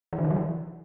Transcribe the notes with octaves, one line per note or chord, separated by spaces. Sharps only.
E3
D3
D#3
F#3
E3